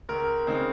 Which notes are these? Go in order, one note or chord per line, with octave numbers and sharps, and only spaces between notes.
C#2 A#4
C#3 G#3 C4 D#4